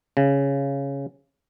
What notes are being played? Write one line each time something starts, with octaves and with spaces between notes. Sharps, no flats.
C#3